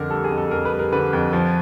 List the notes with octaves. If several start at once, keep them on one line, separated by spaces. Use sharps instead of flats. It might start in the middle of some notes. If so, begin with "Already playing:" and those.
Already playing: F2 D3 A#4
G3 A4
G#4
F2
A4
F2 A#4
B4
G3
A#4
D3 B4
F2
F3